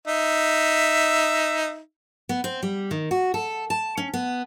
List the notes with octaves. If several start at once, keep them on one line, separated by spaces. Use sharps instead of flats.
D#4 E5
B3
C4
G3
D#3
F#4
A4
A5
C#4
B3